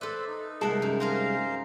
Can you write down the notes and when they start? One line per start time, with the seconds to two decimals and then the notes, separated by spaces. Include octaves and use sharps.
0.01 A4 B4 C5 D5 E5
0.28 D#4
0.61 C2 G#3 A#3 E5 F#5 A5
0.82 F#2
1.00 D#4 G#4 A#4 C5 F5 A#5